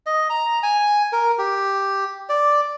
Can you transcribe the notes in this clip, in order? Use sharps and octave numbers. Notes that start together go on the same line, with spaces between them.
D#5
A#5
G#5
A#4
G4
D5